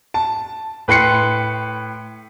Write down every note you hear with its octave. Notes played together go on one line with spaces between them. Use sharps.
A5
A2 B4 G5 C6 C7 C#7